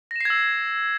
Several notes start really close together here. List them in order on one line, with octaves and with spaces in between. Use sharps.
A#6 E7 C7 G#6 E6